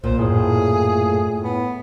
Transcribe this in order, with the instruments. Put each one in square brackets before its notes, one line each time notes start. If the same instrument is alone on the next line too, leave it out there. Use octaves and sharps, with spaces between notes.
[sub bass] B1 [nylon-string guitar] A#2 [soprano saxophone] C5
[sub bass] F#2 [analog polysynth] A2 [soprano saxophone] G#4
[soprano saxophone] B3